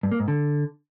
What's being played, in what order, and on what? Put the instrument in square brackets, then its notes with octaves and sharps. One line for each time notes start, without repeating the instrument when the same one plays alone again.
[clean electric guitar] G2
A#3
G#2
D3